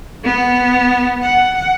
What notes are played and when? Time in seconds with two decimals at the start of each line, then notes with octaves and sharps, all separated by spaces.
0.24 B3
1.22 F#5